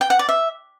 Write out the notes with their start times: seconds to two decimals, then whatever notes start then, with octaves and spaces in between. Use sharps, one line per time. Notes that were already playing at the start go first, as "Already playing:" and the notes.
0.01 G5
0.10 F#5
0.19 D5
0.29 E5